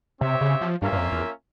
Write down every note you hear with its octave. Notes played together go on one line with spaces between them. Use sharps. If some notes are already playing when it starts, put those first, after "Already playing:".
C3 C4 G4 C#5 E5
C#3
F3
G2 A#3 C#4 F4 A#4 E5
G2
F2
E2